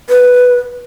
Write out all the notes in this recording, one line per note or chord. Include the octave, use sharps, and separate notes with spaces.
B4